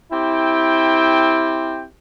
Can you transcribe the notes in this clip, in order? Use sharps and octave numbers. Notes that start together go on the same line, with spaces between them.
C4 E4 G4 G5